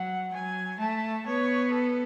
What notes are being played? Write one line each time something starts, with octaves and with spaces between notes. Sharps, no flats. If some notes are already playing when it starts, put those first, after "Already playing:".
Already playing: F#3 F#5
F#3 G#5
A3 A5
B3 C#5
A4